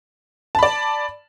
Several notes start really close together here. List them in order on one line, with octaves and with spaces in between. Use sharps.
A5 B5 D5